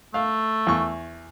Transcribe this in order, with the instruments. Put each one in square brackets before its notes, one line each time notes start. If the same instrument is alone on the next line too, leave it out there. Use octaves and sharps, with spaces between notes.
[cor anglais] A3 [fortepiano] F5
[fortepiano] E2 C#6